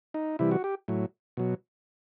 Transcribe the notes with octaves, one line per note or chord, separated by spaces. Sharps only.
D#4
C3 E3 G3 E4
F#4
G4
A2 F#3
B2 F#3